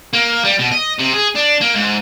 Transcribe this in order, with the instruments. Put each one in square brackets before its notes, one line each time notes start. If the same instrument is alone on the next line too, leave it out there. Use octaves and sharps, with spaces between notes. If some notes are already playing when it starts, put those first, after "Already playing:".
[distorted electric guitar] A#3
G3
B2
D#5
C3
G#4
D4
A#3
G#2